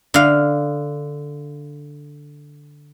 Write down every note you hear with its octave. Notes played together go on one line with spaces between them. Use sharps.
D3 F5